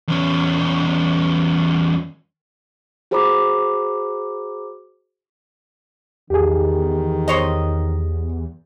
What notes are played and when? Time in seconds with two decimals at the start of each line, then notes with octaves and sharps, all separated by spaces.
0.08 E2 C#4
3.11 F#4 G#4 C5 A#5 B5 D6
6.30 E2 D#3 G4 G#4
7.28 C5 C#5 D#5